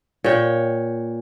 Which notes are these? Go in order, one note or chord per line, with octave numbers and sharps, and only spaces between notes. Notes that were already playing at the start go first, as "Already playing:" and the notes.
A#2 C#5 G5